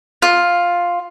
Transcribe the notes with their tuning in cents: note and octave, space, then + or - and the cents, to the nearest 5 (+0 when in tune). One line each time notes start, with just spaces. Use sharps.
F4 +5